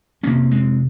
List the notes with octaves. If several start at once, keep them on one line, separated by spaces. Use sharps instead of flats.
F1 F2 C3 A#3 C#4
G#3 C4